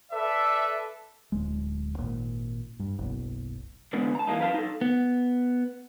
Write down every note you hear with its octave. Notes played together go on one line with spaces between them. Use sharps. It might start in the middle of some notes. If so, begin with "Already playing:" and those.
A4 B4 D5 E5
D1 G#3
G#1 A#2
G2
F#1 B1
D3 G#3 B3 D4 B4
A5 A#5
E3 G#3 A#3 D#4
F#2 B4 F5 A5
D#4 A4
B3